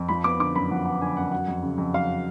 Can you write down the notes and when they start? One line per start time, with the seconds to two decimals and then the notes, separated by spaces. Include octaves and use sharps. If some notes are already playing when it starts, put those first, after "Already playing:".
Already playing: F2
0.09 F3 B5
0.24 B3 D6
0.40 D3 D6
0.55 F#2 B5
0.71 F3 F#5
0.86 B3 F#5
1.01 D3 G#5
1.17 F#2 F#5
1.32 F#3 F#5
1.48 F2
1.63 C#3
1.78 F2
1.93 F#3 F5